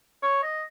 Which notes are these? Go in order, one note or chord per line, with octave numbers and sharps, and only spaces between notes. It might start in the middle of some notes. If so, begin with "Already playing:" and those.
C#5
D#5